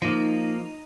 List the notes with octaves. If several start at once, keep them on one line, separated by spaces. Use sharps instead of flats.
F3 A#3 D#4